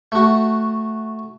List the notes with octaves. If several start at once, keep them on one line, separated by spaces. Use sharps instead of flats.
A3 F#4